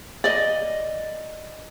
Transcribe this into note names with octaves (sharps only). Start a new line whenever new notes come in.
D5 D#5